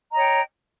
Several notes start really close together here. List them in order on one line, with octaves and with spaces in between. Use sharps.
A#5 D#5 C#5 G5